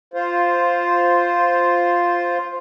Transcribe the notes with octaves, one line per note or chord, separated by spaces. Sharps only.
F4 C5